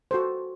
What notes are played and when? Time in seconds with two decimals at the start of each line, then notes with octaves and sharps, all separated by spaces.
0.11 F#4 A4 C5